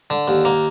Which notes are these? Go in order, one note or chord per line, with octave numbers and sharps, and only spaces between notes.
D3
D#2
A#3